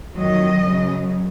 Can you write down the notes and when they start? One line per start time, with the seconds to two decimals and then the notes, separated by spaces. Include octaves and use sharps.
0.15 F2 D#3 F#3 D#5
0.65 F#2 C#3 F#3